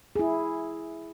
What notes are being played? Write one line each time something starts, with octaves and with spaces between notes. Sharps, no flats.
E4 G#4